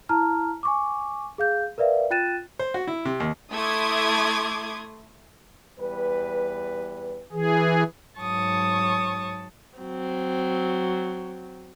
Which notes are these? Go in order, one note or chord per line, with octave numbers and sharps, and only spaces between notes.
E4 A5 A#5 F6
G#5 C#6 D6
G#4 F5 G6
A#4 B4 D5 E5 F5
F4 G5 F#6 A6 D#7 E7
C5
F#4
E4
C3
D#2
A3 E4 C6 D6 D#6 G#6
E2 G3 B4
E3 G#4
G#2 F#3 C#5 A5 C#6 D#6
F#3 C4